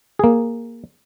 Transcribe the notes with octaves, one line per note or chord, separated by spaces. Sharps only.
A#3 G#4